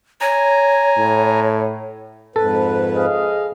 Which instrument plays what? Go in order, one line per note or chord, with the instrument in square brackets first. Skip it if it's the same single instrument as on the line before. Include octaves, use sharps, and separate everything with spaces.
[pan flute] C#5 [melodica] G#5 A#5
[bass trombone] A2
[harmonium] F2 G#2 B4 [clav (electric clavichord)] A4
[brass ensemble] G#4 D#5 F5